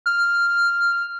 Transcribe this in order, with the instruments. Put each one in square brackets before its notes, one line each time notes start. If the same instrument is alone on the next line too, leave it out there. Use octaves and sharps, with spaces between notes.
[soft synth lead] F6